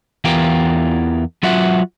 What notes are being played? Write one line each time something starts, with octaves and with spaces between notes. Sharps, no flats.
E2 E3 F4 G4 A#4 G5
F#3 F4 F#4 E5 F#5